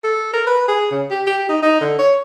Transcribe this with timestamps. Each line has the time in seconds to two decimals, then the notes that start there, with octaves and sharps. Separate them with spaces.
0.04 A4
0.34 A#4
0.47 B4
0.68 G#4
0.91 C#3
1.10 G4
1.27 G4
1.49 D#4
1.62 D#4
1.81 D3
1.99 C#5